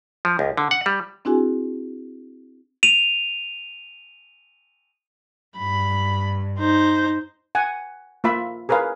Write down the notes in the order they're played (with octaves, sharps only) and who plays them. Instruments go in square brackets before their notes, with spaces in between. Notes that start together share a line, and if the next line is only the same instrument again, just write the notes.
[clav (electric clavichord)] F3
C#2
D3
F#5
G3
[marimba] C4 D4 E4 F#4 G#4 G#5
[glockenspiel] D#7 F7
[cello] G2 [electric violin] B5
[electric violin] D#4 C5
[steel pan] F#5 G#5
A#3 F4 E5 B5
G#4 A#4 B4 C#5 F5